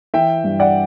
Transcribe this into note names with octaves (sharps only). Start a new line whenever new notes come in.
E3 E5 G5
G2
D5 F#5